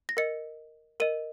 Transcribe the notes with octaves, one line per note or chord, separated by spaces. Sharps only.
A#6
A#4 D#5 C#7
A#4 D#5 D#7